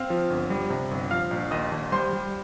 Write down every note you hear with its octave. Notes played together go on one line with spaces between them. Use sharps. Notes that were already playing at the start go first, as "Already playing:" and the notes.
Already playing: C4 F5 F6
F3
G1
G3
C3
G1
F3 F5 F6
A#1
D#2 D#5 D#6
D#2
G3 C5 C6
G3